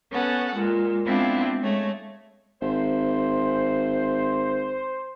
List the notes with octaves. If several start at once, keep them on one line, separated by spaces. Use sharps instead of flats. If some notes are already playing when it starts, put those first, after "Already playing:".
B3 C#4 A4 F#5
A#2 G#3
G#3 B3 C4 D4 E4 F4
G#3 A3 C#5
G#1 C5